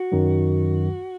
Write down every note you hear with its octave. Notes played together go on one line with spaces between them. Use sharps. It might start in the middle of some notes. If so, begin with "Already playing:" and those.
Already playing: F#4
F#2 D#3 F#3